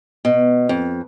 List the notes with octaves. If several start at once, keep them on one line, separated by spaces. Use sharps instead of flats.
B2
F2